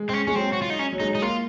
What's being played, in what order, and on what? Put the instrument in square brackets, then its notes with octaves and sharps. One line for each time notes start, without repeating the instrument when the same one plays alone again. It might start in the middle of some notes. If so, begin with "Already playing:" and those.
Already playing: [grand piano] G#3
[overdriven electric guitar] C4
C#4
[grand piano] G#3 [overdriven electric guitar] C#4
[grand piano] F#3 [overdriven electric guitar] C4
[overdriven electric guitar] F#4
F4
D#4
C#4
[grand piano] F#3
[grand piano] G#3 [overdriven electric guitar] D#4
[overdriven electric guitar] D#4
[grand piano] A#3 [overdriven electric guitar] F4